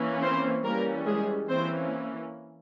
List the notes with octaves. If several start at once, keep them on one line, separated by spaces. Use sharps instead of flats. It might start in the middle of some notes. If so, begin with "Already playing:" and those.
Already playing: E3 A#3 C#4
C4 C5
E3 G3 A#3 C#4 A#4
G#3 G#4
E3 A#3 C4 C#4 C5